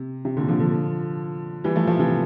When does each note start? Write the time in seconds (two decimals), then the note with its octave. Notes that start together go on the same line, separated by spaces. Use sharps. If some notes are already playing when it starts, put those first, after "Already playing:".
Already playing: C3
0.25 C3
0.37 A#2 D3
0.49 D3 F3
0.60 D3 F3
1.64 E3 G3
1.76 F3 A3
1.87 F3 A3
1.99 C3 E3